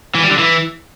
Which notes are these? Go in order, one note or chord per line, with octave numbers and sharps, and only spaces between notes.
E3
G3
D3
E3